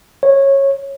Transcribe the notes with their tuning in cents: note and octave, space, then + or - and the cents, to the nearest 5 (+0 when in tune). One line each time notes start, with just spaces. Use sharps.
C#5 -15